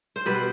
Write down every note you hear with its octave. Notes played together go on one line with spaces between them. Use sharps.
C5
B2 G3 B4